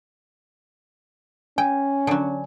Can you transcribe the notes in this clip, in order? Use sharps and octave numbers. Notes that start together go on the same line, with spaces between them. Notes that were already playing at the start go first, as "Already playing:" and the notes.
C#4 G5 G#5
D3 F#3